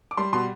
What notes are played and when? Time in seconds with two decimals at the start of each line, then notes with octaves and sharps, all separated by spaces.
0.11 D6
0.17 G3 C6
0.33 B2 C6